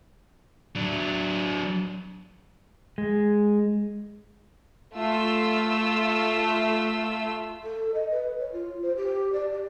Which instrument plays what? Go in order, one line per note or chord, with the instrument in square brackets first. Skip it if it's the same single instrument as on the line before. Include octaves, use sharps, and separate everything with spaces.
[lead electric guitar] F#3 D4
[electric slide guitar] G#3
[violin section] A3 F4 E6
[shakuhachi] A4
D#5
B4
C#5
F4
C5
G4
D5
G4